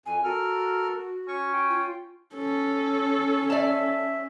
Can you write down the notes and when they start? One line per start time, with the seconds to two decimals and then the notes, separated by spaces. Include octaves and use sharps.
0.06 F2 G#5
0.24 F#4 A4 A#4 F6
1.28 C#4 C#6
1.53 G5
1.70 F4
2.35 C#4 A4
3.50 D5 E5 A5